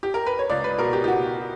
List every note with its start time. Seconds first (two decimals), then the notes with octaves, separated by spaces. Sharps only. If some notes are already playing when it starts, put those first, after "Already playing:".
0.03 G4
0.14 A#4
0.26 B4
0.39 C#5
0.50 C#2 D5
0.64 B4
0.78 B2 A#4
0.93 G4
1.04 G4
1.08 B2 F#4